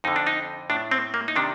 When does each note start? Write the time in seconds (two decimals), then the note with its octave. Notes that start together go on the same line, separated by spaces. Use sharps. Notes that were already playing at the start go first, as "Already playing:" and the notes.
0.04 F2 D3 D#4
0.16 D4
0.27 D#4
0.70 A2 D4
0.91 C4
1.14 A#3
1.28 D#4
1.36 C3 D#3 D4